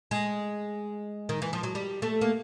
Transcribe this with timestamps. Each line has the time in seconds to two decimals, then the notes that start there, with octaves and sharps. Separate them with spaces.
0.11 G#3
1.29 D#3
1.42 E3
1.53 F3
1.63 F#3
1.75 G3
2.02 A3
2.21 A#3